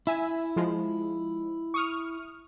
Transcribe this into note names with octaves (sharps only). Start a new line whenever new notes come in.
E4 E5 G#5
F3 G#3
C#6 D#6 F6